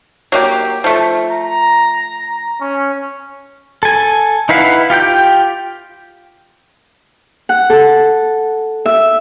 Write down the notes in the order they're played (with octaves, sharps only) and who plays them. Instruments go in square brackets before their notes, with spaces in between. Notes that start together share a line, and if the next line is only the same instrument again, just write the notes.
[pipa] F#3 A#3 G4
F3 A3
[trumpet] A#5
C#4
[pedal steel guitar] A4 G#5
D#4 E4 B4 F5 F#5
F4 G4 G5 G6
[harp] F#5
A4
E5